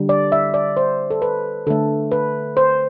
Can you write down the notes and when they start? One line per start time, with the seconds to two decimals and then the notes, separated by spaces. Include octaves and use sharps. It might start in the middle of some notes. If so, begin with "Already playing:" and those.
Already playing: D3 G3
0.09 D5
0.32 E5
0.54 D5
0.77 C5
1.10 A4
1.22 B4
1.67 D3 A3 A4
2.12 B4
2.57 C5